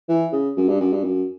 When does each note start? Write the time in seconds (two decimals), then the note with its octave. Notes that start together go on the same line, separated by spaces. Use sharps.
0.09 E3
0.32 C#3
0.57 F#2
0.68 G2
0.80 F#2
0.93 G2
1.04 F#2